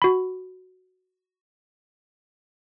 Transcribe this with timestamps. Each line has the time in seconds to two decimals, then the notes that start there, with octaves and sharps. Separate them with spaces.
0.02 F#4 B5